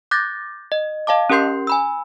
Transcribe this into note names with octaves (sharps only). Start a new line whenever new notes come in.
D6 F#6 G6 A6 A#6
D#5
D#5 F5 A5 D6
C#4 G4 A#4 C6 G6 C7
G#5 B5 E6